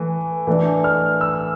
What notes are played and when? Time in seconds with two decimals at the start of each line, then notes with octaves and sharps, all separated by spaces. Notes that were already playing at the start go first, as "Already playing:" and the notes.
Already playing: E3 A3
0.47 E3 A3 D4
0.84 F6
1.21 E6